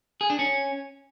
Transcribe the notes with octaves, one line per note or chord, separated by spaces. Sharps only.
G#4
D4
C#4